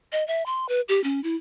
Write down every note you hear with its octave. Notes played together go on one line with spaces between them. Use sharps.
D#5
E5
C6
B4
G4
C#4
E4